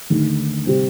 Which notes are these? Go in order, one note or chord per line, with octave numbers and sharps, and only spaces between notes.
D#2 D3 A3 D#4
C3 G3 C4